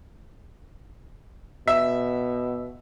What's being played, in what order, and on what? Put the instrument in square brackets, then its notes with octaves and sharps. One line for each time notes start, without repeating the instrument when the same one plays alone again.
[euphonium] B2 [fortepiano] E5